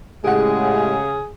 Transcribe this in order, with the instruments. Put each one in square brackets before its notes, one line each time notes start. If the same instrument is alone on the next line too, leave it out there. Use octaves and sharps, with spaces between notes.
[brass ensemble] A2 G#3 [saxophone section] C#3 [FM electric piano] G4 F#5 [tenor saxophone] G#4